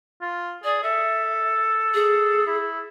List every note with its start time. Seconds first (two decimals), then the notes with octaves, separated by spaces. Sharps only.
0.21 F4
0.64 G#4 D5
0.83 A4 E5
1.94 G#4
2.47 E4